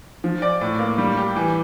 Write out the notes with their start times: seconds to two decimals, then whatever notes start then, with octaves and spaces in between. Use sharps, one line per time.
0.24 F3
0.42 D5
0.61 A2
0.79 A#3
0.98 G3
1.17 G4
1.36 E3